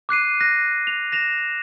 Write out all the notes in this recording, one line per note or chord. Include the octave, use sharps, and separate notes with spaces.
D6 F#6 C7 D#7
F#6 A#6
F7
A#6 E7 F7